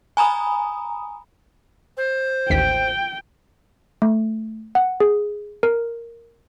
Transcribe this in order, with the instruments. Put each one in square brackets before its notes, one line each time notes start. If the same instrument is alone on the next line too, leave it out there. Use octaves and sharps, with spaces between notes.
[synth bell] G#5 A#5 B5 D#6
[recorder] C5
[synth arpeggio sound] A1 D#2 B6 [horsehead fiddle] G5
[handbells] A3
F#5
G#4
A#4